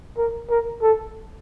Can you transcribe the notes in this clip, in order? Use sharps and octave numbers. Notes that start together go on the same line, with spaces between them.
A#4
A#4
A4